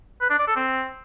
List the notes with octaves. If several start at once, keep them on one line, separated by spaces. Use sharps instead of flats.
B4
D4
D5
A4
C4